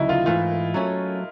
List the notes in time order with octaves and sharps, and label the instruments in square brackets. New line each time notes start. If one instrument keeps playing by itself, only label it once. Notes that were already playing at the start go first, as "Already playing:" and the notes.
Already playing: [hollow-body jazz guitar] D2 C#3 F#3 [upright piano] D#4 E4
[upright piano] F4
[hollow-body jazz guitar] G#2 E3 A3 [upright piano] F4
[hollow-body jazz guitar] F#3 A3 C#4